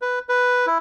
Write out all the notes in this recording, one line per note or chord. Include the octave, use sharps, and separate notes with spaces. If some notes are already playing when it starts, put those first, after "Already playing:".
B4
B4
E4